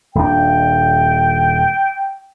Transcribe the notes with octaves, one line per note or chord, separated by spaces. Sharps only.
D#1 D4 G5